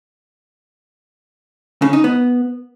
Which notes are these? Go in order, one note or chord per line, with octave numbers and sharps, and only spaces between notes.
C#3
D#4
B3